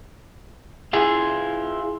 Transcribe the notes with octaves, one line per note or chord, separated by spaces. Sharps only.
E4 F4 G#4